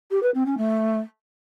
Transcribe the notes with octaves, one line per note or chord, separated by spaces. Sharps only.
G4
B4
C4
C#4
A3